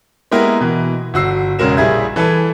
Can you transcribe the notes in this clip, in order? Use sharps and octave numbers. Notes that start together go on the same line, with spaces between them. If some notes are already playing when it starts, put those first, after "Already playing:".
G#3 A#3 B3 E4 G4 A#4
B2 E3
G1 F#4 E6 C7
E1 C#3 G#3 F#4 A#4 E7
A#1 G3 E4 G#4 E5 G#6
E3 A4 B4 G#6